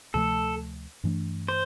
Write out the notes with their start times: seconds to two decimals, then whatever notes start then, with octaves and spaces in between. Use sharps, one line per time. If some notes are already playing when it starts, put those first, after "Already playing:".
0.14 D2 C3 F3 A3 A4
1.04 G2 E3 A3 D4
1.48 C5